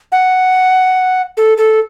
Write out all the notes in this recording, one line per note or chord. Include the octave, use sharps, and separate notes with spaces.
F#5
A4
A4